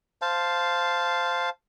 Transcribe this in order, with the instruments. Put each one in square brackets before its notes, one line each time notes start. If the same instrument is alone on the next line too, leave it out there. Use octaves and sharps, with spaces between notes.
[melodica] C5 F5 A5